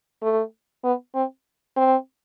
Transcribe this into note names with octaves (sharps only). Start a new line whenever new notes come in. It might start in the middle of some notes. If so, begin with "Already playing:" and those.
A3
B3
C4
C4